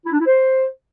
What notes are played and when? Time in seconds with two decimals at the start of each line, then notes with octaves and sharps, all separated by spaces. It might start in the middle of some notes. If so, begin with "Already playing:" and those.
0.05 E4
0.12 D4
0.19 E4
0.26 C5